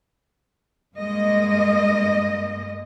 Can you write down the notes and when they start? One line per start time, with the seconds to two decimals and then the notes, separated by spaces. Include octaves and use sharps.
0.95 G2 G#3 A#3 D#5